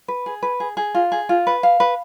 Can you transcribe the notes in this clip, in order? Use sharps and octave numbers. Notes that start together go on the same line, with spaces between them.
B4
G#4
B4
G#4
G#4
F4
G#4
F4
B4
F5
B4